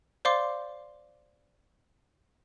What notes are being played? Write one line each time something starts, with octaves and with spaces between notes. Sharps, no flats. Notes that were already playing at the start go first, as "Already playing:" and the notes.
C5 D5 F5 C6 D6